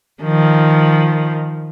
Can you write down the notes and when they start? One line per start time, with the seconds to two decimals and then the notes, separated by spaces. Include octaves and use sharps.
0.23 D#3 F3